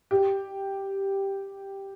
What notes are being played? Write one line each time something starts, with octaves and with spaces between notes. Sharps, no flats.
G4